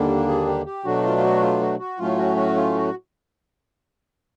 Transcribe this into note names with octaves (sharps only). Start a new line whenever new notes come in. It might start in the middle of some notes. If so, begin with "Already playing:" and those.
Already playing: D#2 D3 G3 A#3 D4
G#4
G4
G4
B2 F#3 A3 D4 F#4
F4
F4
F#4
F4
F#4
F#4
A2 F#3 A3 C#4 F4
F#4
F#4
F4
F#4